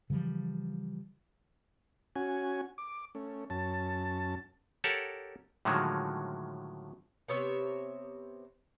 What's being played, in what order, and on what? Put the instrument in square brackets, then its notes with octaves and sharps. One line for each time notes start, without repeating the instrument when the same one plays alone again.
[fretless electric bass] C#3 E3 F3 G3
[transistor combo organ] C#4 F#4 G#5
D6
A3 C#4
F#2 C#4 A5
[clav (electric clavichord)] G4 A4 A#4 C#5 F#5 A5
A2 D3 D#3 F3 F#3 G#3
[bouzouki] C3 B3 C#5 E5